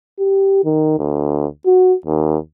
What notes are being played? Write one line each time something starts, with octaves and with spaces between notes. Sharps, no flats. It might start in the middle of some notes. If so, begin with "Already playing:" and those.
G4
D#3
D2
F#4
D#2